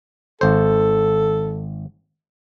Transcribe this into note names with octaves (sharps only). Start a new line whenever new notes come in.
G#1 A4 C5